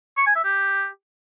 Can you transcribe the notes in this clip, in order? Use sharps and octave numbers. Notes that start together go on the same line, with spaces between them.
C#6
G#5
E5
G4